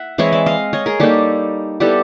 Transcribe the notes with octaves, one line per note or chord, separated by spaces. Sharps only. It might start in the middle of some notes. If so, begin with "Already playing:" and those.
Already playing: E5 F#5
E3 G#3 C4 E4 C#5 D#5
D5 E5
D#5 F5
C#5 D#5
G#4 A#4
G3 A#3 D#4 G4 A4
G3 B3 E4 G4 A4